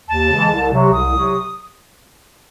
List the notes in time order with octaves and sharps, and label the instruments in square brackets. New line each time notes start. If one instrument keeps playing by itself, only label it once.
[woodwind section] D#2 [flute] A5
[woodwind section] C#3 E3 G#3
C2
C3 F#3
[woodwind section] C2 [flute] D#6
[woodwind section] C3 F#3